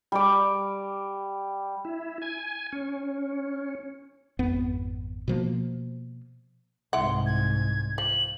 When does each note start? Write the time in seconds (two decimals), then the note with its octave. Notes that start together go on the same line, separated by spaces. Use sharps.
0.12 G3 D6
1.85 E4
2.22 G#5
2.72 C#4
4.39 G#1 F2 B3
5.28 B2 F3 A#3
6.93 C2 G#2 E4 F#5 C6
7.26 G#6
7.98 F3 F#7